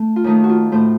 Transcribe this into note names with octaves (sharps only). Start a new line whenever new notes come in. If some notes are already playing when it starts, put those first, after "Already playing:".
Already playing: A3
F4
D#2 D#3 A3 D#4
F#4
F4
A2 A3 C5